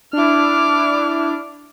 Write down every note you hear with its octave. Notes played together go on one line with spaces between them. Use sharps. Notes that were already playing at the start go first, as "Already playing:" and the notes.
D4 E4 D6 F6